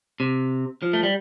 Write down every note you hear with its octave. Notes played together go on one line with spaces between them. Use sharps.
C3
F3
A3
G3